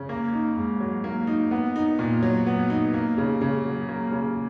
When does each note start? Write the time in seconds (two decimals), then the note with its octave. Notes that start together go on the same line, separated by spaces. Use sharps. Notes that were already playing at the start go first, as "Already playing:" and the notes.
Already playing: C#3
0.09 A#3
0.33 D#4
0.57 G#2
0.80 F#3
1.04 A#3
1.27 D#4
1.51 B3
1.76 D#4
1.99 A#2
2.22 F#3
2.46 B3
2.70 D#4
2.94 A#3
3.18 C#3
3.41 C#3
3.65 F#3
3.89 A#3
4.12 C#3